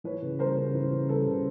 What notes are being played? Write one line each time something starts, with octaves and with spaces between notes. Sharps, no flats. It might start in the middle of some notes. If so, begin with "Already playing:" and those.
E3 B4 C#5
C#3
G3 A#4 C5
C#3
E3
C#3
G3 A4 B4
C#3